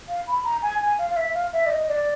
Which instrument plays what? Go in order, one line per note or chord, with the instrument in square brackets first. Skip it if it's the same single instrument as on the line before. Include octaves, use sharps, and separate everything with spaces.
[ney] F5
B5
A#5
G#5
G#5
F5
F5
E5
F5
E5
D5
D#5
D5